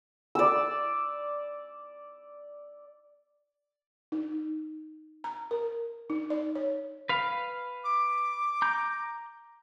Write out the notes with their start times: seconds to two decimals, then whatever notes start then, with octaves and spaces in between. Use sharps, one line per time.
0.35 D5 E6
4.12 D#4
5.24 A#5
5.51 A#4
6.10 D#4
6.30 D5
6.55 C#5
7.09 B4 F5
7.83 D6
8.62 A#5 G6